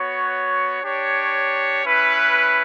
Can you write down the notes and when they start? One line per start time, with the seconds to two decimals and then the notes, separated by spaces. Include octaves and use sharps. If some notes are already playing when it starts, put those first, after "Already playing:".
Already playing: B3 F#4 C#5
0.81 D4 G4 C#5
1.83 C#4 E4 B4